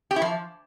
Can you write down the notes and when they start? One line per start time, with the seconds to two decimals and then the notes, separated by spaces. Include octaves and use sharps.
0.11 G4
0.16 E4
0.22 F3